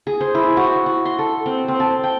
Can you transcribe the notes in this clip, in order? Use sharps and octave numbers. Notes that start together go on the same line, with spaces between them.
G#4
C5
E4
F#4
F#4
C6
A4
C4
C4
A5
G5